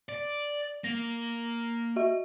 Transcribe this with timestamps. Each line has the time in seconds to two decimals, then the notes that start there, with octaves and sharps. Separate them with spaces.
0.09 D5
0.84 A#3 A#6
1.96 F#4 E5